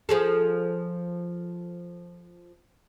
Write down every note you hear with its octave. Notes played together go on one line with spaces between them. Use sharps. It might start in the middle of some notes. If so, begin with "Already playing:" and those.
F3 G#4 A4